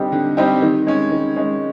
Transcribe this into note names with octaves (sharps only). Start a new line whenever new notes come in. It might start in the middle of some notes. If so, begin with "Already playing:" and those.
Already playing: D3 G3 C4 D#4 G4
D3
G3 C4 D#4 G4
D#3
G#3 C#4
D#3
G#3 C#4